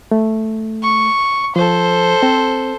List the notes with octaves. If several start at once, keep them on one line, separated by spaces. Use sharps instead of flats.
A3
C#6
F3 A4 C5
C4